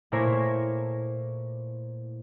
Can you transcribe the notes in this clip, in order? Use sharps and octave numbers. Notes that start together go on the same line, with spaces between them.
A#2 A3 E4 A#4 C5 C#5